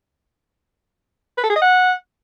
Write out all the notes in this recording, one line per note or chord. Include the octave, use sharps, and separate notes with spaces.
B4
A4
G#4
D#5
F#5